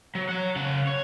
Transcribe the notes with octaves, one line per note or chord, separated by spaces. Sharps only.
F#3
C#5 F#5
C#3 F#5
C#5